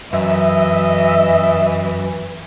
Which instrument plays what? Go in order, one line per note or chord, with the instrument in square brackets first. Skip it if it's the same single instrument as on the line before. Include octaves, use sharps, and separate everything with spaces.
[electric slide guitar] F#2 [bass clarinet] E3 [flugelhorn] D#5 [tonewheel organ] E5